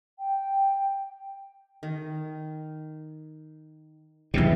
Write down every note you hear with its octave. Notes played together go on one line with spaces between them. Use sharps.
G5
D#3
B1 E2 B2 E3 G3